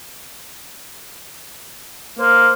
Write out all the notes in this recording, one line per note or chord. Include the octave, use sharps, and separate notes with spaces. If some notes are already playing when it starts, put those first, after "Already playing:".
A#3 C5